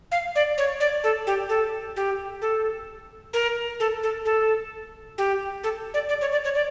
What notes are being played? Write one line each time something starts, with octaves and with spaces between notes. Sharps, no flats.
F5
D5
C#5
D5
A4
G4
A4
G4
A4
A#4
A4
A4
A4
G4
A4
D5
D5
C#5
D5
C#5
D5